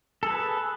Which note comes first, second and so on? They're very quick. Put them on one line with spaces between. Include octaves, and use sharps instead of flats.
A4 G#4 B4